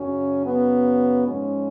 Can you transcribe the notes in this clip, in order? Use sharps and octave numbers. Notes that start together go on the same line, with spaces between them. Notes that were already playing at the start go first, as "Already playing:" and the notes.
Already playing: F#2 C#3 F#3 C#4
B3
G#2 F3 G#3 C#4